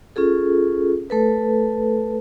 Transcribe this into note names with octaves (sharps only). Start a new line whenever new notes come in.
C#4 F4 G#4 A4
A3 A4 B4